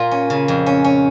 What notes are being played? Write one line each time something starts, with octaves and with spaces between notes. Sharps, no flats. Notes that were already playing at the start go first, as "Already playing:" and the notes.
Already playing: A#2 F4
C#4
C#3
F2
C#4
C#4